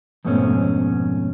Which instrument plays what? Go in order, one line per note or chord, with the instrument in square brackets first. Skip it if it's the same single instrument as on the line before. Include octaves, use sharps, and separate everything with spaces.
[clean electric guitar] F2 G#2 B2 A3 B3 C#4